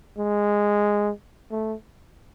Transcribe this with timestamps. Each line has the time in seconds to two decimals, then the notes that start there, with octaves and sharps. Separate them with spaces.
0.18 G#3
1.51 A3